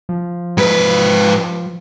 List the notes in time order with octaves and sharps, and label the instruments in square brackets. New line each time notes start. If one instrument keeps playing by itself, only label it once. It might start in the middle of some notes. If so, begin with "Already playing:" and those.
[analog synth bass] F3
[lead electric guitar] G#2 B4